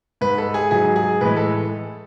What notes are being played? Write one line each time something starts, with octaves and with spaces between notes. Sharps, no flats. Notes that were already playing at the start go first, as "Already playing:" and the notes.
G#2 G#3 B4
A4
G#4
G#2 F#3 G#4
G#4
A2 E3 G#3 B4
A4